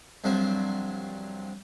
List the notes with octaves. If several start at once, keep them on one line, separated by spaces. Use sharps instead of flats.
C2 G2 F3 F#3 C4